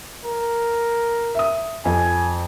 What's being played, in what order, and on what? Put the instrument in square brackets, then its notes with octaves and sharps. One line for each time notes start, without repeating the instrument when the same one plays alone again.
[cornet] A#4
[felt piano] E5 D#6
[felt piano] F2 [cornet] G#5